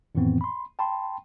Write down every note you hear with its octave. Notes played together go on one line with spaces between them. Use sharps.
F2 A2 D#3 E3 B3 C4
B5 C6
G5 A5 B5 C6